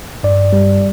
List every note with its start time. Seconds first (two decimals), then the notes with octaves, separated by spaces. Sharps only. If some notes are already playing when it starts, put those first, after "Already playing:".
0.23 G2 D5
0.53 G3